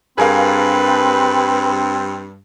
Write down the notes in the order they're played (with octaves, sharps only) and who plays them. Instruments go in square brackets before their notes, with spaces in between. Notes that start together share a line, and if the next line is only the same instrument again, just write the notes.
[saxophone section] G2 [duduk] C4 [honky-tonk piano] G#4 A#4 F5 [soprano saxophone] B4